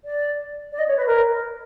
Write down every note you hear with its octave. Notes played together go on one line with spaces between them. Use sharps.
D5
D5
D#5
C#5
B4
A#4